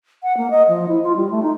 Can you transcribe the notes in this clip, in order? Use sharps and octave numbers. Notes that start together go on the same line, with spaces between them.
F#5
A#3
D#5
F3
E4
F4
G3
A3
D#4